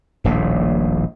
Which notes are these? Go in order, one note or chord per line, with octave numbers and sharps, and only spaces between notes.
D#1 A#1 A2